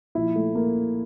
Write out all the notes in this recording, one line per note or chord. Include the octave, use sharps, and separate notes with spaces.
A#2 F3 E4
A3
A#3